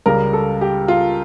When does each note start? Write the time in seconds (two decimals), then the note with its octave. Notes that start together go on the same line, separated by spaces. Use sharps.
0.06 C#2 C#3 G3 A#4
0.33 A4
0.61 G4
0.88 F4